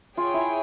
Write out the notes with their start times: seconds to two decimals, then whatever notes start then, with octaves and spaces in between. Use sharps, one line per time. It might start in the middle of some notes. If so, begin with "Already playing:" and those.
0.17 F4 G#4 C#5 G5
0.34 E4